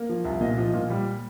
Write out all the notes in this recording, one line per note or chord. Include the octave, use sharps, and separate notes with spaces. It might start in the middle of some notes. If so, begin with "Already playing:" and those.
Already playing: A#3
F3
C2
A#2 D#5
F3
A#2
G3